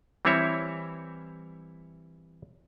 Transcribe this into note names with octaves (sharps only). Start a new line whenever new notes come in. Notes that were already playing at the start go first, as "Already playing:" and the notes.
E3 G3 C4 E4 C#5 E5